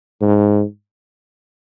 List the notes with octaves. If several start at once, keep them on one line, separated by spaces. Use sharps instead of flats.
G#2